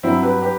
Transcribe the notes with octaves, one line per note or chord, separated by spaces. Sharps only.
G2 F#3 C4 E4
G4 B4
G4 B4